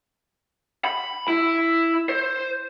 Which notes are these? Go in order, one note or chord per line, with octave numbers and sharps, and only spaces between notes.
B5
E4
C5